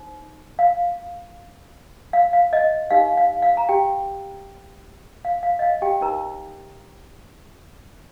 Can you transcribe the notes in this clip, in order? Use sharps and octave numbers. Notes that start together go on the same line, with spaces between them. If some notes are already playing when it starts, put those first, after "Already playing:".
Already playing: D#4 C5
F5
F5
F5
D#5
D#4 G4 A#4 F5
F5
F5
A#5
G4 G5
F5
F5
D#5
F5
G4 G5
D#4 G4 A#4 C5 A#5